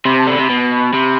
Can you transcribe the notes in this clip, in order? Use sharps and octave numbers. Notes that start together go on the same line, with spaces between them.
C3 B5
A5
D3 B5
C3
B2
C3